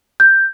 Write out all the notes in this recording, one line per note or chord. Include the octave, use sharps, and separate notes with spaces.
G6